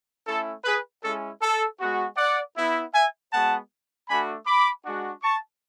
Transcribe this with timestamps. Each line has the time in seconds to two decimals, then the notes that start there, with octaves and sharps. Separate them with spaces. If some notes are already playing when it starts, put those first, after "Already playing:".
0.27 A3 C#4 E4 A4
0.64 G#4 B4
1.03 G#3 C#4 E4 A4
1.42 A4
1.79 G#3 B3 F#4
2.17 D5 F#5
2.56 B3 E4
2.93 E5 G#5
3.32 G#3 B3 F#4 F#5 A5
4.09 A3 D4 F#4 G#5 B5
4.46 B5 D6
4.84 G#3 D4 F#4
5.23 A5 C#6